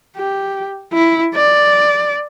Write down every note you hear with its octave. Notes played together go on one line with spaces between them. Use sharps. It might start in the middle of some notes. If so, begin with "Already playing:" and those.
G4
E4
D5